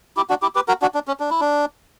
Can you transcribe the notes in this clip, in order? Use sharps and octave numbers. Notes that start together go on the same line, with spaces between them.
E4 G4
D4 F#4
E4 G4
G4 B4
F#4 A#4
D4 F#4
D4
C#4
D4
E4
D4